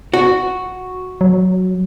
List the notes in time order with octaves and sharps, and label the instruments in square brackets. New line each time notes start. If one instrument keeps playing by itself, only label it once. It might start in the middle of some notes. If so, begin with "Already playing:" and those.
[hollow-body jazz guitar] F#4
[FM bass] F#3